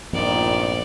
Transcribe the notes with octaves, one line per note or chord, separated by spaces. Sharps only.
A#1 G2 A#2 D#3 F3 B3 C4 D5